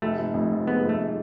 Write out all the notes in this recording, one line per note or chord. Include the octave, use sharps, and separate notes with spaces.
F1 A3
F1
F2
F3
G#3 B3
F1 A3
G#3